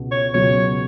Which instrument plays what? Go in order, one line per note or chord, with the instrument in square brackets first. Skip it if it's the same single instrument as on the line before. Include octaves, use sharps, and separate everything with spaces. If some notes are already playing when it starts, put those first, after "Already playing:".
Already playing: [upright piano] C#2 B2
[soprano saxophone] C#5
[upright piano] C#2 B2 F#3 C#4 [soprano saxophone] C#5